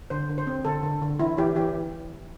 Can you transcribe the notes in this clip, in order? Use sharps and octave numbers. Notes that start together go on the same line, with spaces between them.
D3 C5
D3
C5
C4
D3 A4
D3
D3
E3 E4
E3 G4
E3 G4